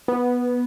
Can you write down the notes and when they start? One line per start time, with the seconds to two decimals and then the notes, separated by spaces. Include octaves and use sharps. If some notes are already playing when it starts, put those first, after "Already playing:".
0.08 B3